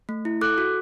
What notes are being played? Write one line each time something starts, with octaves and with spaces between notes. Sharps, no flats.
A3
E4
A4 D6 F#6
F#4